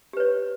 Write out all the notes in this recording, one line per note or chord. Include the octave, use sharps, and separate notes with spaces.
G4 B4 C#5